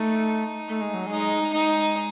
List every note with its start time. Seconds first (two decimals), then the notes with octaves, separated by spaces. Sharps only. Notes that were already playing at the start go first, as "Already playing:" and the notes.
Already playing: A3 D#4
0.69 A3
0.81 G#3
0.94 F#3
1.07 G#3 D#4
1.53 G#3 A3 D#4